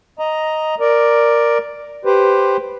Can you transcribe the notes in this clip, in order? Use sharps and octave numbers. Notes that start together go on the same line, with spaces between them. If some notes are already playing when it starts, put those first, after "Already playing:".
D#5 A#5
A#4 D5
G4 B4 C5